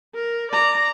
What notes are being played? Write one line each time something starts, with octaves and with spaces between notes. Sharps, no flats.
A#4
D5 A#5